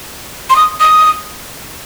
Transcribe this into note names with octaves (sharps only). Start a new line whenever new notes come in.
C6
D#6
D#6